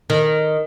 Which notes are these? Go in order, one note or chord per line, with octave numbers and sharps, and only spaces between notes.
D#3